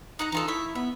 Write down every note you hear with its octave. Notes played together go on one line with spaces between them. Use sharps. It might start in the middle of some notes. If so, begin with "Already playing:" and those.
D#4 F#5 A#5
E3 D#4 F4 A4
A3 E4 E5
B3 E5